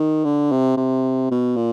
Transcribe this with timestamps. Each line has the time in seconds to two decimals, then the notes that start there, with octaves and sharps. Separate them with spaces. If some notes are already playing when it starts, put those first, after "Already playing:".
Already playing: D#3
0.24 D3
0.52 C3
0.77 C3
1.31 B2
1.56 A#2